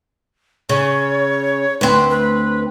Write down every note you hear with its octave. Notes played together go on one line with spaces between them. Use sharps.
C#3 C#5
D2 C4 B4
B4